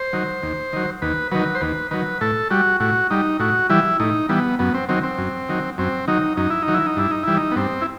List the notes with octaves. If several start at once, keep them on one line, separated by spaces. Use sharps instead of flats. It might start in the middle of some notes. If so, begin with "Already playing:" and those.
Already playing: C5
D#3 F#3
D#2
D#3 F#3
D#2 B4
D#3 F#3 B4
C5
D#2 B4
D#3 F#3 B4
A2 A4
G3 F#4
A2 F#4
G3 D#4
A2 F#4
E3 G3 E4
A2 D#4
E3 G3 B3
F#2 B3
C4
D#3 F#3 C4
C4
F#2
D#3 F#3
F#2 C4
D#3 F#3 D#4
F#2 D#4
E4
D#4
D#3 F#3
E4
D#4
G2 E4
D#4
E3 G3 E4
D#4
B3
G2 C4
E4